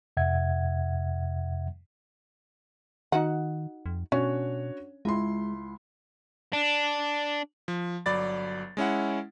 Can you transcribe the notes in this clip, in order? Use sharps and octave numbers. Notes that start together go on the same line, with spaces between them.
F2 C3 E5 F#5 G#6
D#3 D#4 F#4 F#5
F2
B2 C#4 D4 F#4 C#5
C#2 G#3 E4 C6
D4
F3
G1 F#3 D5 B5 A6
G#3 C#4 E4 F#5